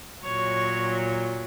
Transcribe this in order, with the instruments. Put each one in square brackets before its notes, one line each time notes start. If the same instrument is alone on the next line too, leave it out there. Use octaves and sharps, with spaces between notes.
[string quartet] A#2 F#3 C#5